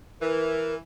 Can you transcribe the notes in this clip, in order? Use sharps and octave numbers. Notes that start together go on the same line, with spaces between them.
E3 A#4